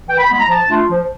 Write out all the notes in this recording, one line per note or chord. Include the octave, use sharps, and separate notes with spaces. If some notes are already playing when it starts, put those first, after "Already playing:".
E3 G5
B5
G#3 B3 E4 B5
A#5
F3 A5
A3 D4 F4
F3